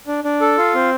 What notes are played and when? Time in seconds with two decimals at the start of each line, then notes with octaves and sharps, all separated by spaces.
0.07 D4
0.24 D4
0.41 A4
0.58 F4
0.74 C4